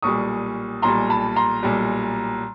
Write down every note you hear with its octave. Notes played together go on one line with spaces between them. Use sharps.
B1 A#2 G3 C#6 D#6
B1 A#2 G3 A#5 C6
A5 B5
A#5 C6
B1 A#2 G3